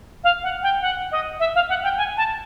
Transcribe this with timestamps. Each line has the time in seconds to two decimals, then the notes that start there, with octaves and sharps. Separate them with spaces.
0.24 F5
0.43 F#5
0.63 G5
0.82 F#5
1.12 D#5
1.40 E5
1.55 F5
1.69 F#5
1.84 G5
1.97 G#5
2.17 A5